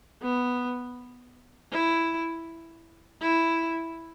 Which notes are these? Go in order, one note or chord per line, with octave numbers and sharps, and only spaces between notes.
B3
E4
E4